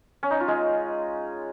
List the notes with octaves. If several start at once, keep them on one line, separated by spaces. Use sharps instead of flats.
C#4
D#4
F4
G#3 G#4